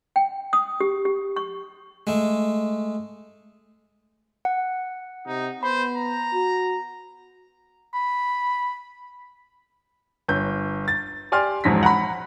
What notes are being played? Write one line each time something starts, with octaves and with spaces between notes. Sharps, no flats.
G5
D#6
G4
G4
C#6
G#3 A3
F#5
C3 D#4
B3 C5 B5
A#5
F#4
B5
G1 C#5 G6
A6
G4 D5 G#5 C6 F6
E1 F2 G#2 A#6 B6
F#5 A#5 B5